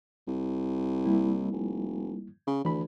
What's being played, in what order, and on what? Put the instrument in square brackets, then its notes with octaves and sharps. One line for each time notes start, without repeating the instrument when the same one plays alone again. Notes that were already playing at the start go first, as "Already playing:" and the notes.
[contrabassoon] C2
[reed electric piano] G3 A#3 E4
[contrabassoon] F1
C#3
[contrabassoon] D2 [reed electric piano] E3 B5